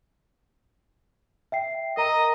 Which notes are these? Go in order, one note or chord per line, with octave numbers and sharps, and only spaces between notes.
E5 G5 C7
A#4 D#5 G5 A#5